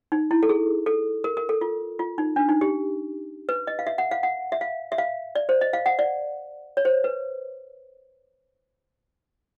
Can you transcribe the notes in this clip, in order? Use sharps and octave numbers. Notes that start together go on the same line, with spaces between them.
D#4
E4
A4
G#4
A4
A#4
A#4
A4
F4
F4
D#4
D4
D#4
G4
B4
D#5
F5
E5
F#5
F5
F#5
E5
F5
E5
F5
D5
C5
D#5
F5
F#5
D5
C#5
C5
B4